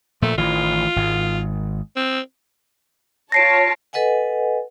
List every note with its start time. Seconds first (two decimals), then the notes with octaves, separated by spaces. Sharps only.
0.22 A#2 F3 A3
0.38 A1 D#3 E3 F4
0.96 G#1 G#2
1.96 C4
3.32 F4 C#5 A5 A#6 C7 D7
3.93 A4 B4 D#5 F#5 G#5